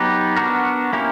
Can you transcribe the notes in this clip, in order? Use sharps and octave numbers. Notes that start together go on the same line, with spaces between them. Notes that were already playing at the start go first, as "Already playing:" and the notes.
Already playing: F#3 B3 D#4 G4 B4
B3 D4 F#4 A#4
A#3 C#4 E4 G4 A#4